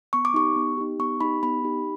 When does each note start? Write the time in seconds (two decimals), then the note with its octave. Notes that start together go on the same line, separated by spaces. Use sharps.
0.13 B3 C#6
0.25 D6
0.34 D#4 G4 C#6
0.56 B3
0.77 D#4 G4
0.99 B3 C#6
1.21 D#4 G4 B5
1.43 B3 B5
1.64 D#4 G4